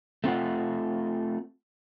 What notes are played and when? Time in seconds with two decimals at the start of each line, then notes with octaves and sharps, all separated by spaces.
0.24 A3 C4 F4 F#5